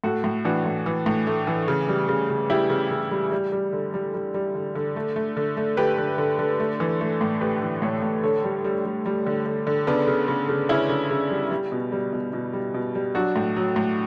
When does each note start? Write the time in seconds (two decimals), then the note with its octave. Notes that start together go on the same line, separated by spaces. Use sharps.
0.04 A2 F#4 A4
0.24 A2
0.45 E3 D4 F#4
0.66 A2
0.86 E3
1.06 A2
1.27 A3
1.47 E3
1.68 C#3
1.89 G3
2.09 C#3
2.30 C#3
2.50 G3 E4 G4
2.70 C#3
2.91 C#3
3.11 G3
3.32 G3
3.52 G3
3.73 D3
3.94 G3
4.14 G3
4.34 G3
4.55 D3
4.75 D3
4.96 A3
5.16 A3
5.37 D3
5.57 A3
5.77 D3 G4 B4
5.98 D3
6.18 D3
6.39 D3
6.60 A3
6.80 E3
7.01 A3
7.21 A2
7.41 A3 G4 B4
7.62 E3
7.82 A2 A4 C#5
8.03 A2
8.23 D3 A4 C#5
8.44 G3
8.64 G3
8.85 G3
9.06 G3
9.26 D3
9.46 D3
9.67 D3
9.87 C#3 B3 D4
10.07 C#3
10.28 C#3
10.49 C#3
10.69 C#3 C#4 E4
10.89 C#3
11.11 C#3
11.31 G3
11.51 G3
11.72 B2
11.92 G3
12.13 B2
12.33 B2
12.53 G3
12.74 B2
12.95 G3
13.15 F#3 D4 F#4
13.36 A2
13.56 F#3
13.76 A2